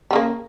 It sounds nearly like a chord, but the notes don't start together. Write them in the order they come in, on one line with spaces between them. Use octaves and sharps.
G3 C#3 A#3